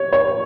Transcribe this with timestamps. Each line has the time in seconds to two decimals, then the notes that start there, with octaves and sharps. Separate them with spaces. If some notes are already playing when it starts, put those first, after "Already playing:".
Already playing: C#5
0.13 C#5